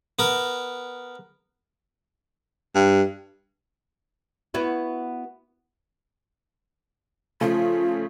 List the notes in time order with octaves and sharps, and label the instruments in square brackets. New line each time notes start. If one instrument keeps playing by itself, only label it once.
[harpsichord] B3 A#4
[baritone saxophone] G2
[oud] B3 E4 F#4
[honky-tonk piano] C#3 F3 A3 [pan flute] F4